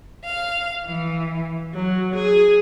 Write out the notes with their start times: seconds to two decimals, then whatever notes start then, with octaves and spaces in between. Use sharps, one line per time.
0.25 F5
0.85 E3
1.73 F#3
2.15 G#4